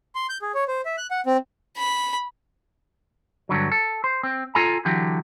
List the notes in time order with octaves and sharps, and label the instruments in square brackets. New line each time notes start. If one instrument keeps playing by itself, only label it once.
[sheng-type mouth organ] C6
G6
G#4
C#5
C5
E5
F#6
F#5
C4
[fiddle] B5
[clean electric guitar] G2 D3 F#3
A4
C5
C4
F4 A4 G#5 A#5
D3 E3 F#3 G4